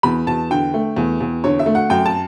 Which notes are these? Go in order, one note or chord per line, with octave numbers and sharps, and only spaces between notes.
E2 B5
E2 A5
D3 G5
A3
E2
E2
D3 C#5
E5
A3
F#5
F#2 G5
A5